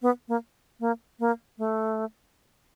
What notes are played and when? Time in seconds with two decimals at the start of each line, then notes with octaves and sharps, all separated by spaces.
0.02 B3
0.28 A#3
0.80 A#3
1.19 A#3
1.58 A3